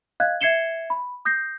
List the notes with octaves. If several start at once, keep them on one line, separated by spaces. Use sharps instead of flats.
D#5 F5 F#6 G#6
E5 G#6 C7 C#7 E7 G7
B5
D#6 G6 A#6 C7